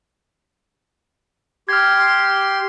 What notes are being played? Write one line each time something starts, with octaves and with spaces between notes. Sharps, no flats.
G4 C6 F6 G#6